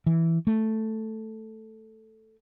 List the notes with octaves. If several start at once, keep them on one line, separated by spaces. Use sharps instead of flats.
E3
A3